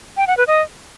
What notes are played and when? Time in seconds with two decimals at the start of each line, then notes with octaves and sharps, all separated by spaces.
0.17 G5
0.27 F#5
0.37 B4
0.47 D#5